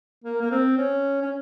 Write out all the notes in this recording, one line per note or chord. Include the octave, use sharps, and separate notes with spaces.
A#3
A#3
C4
C#4
C#4